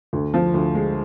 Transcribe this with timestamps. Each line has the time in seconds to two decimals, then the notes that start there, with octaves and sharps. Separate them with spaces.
0.13 D2
0.34 F3
0.54 D2
0.75 G#3